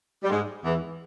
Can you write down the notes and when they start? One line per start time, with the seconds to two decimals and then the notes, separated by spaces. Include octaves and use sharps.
0.23 G3
0.29 G#2 G#3
0.64 E2 E3